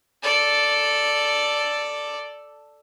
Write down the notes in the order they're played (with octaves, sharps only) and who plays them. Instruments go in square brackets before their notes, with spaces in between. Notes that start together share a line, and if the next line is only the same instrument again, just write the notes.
[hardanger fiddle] A4 D5